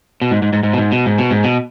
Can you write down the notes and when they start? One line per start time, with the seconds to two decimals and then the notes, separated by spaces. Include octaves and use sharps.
0.22 B2
0.31 G#2
0.42 G#2
0.53 G#2
0.63 G#2
0.73 B2
0.78 G#2
0.92 B2
1.06 G#2
1.18 B2
1.31 G#2
1.44 B2